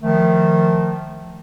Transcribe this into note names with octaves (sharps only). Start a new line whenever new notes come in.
D#3 F3 A3